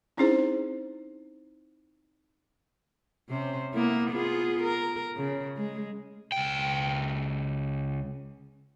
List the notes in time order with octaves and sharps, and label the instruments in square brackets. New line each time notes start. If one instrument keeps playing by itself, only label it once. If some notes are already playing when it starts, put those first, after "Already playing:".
[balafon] C4 C#4 D#4 E4 G#4 C5
[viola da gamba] C3 C#4 C5
A#3 B3 E4
B3 F4 G#4
A#4
C#3
G#3
[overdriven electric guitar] C#2 G5